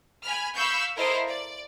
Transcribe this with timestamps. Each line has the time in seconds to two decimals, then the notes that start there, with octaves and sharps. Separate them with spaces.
0.23 G#5 B5 F6
0.55 F5 B5 C#6 E6 G6
0.97 E4 A4 A#4 C5 D#5 F5
1.27 D5